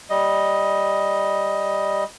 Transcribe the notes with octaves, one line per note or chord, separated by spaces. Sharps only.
G3 D#5